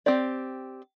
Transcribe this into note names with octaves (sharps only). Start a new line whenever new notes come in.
C4 G4 D5